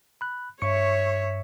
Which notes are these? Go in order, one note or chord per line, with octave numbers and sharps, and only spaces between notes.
B5 F#6
G2 C#5 E5 C#6 C#7